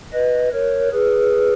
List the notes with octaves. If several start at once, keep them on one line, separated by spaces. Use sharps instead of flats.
B4 D#5
A#4 C#5
G#4 B4